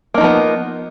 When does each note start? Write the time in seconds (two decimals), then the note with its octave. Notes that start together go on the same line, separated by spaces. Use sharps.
0.14 A#3
0.18 D#4
0.21 F3
0.24 B3